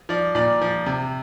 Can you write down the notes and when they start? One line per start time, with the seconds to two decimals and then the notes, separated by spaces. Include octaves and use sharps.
0.09 F3 D5
0.35 A#2 D5
0.61 F3
0.86 C3